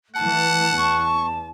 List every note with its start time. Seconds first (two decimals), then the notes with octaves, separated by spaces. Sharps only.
0.15 E3 A3 F#5 A5
0.78 E2 C#6